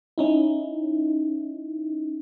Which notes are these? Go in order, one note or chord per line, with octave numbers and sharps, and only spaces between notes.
C#4 D#4 E4